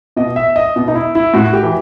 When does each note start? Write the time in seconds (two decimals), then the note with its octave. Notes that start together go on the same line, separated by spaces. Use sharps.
0.16 B2 D#5
0.36 E5
0.56 D#5
0.76 B2
0.88 D#4
0.95 E4
1.15 E4
1.34 A2 F#4
1.53 G4
1.63 E3